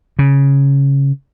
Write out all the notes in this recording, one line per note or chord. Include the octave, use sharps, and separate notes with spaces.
C#3